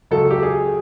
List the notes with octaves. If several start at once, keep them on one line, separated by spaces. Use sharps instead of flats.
C#2 C#3 F#3 A4
G4
G#4